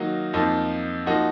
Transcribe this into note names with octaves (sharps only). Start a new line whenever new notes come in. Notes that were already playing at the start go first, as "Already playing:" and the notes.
Already playing: D#3 F#3 A#3 D#4 F#4
F2 F3 A#3 D#4
F3 A#3 D#4 F#4